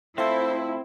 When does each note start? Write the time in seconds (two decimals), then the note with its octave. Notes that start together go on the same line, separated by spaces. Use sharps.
0.18 A3 C4 E4 F4 A4 C5